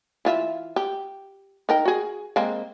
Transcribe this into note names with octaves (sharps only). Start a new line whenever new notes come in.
E3 F4 E5
G4
D#4 A#4 G5
F#4 G#4
G#3 A#3 C4